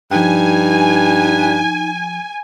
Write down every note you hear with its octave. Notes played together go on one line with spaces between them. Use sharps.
G2 F3 D#4 G5 G#5